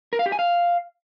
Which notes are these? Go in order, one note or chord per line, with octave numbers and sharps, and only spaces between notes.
A#4
F5
G4
G#5
F5